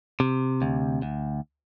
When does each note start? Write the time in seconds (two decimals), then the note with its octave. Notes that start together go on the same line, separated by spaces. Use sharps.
0.20 C3
0.62 D2
1.02 D2